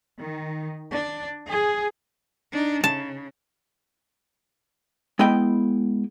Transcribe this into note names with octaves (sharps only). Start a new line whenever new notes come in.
D#3
D4
G#4
D4 D#4
C#3 A5
G#3 B3 E4 D#5 G5